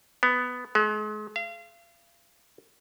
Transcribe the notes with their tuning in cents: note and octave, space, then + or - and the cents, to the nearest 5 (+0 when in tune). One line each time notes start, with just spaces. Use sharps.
B3 +10
G#3 +40
F5 -35